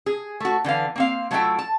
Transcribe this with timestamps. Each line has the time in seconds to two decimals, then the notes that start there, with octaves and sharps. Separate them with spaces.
0.06 G#4
0.40 A3 F#4
0.64 D3 E3 B3 F5
0.96 A#3 C4 F5
1.31 F#3 A3 E4 F4 E5 G5
1.59 A5